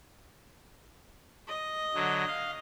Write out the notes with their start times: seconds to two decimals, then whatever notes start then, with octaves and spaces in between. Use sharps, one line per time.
1.48 D#5
1.94 D3 F#3
2.27 F5